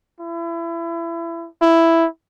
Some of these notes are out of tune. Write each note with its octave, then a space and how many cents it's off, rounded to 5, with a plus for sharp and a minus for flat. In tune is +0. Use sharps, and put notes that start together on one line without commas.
E4 +30
E4 +5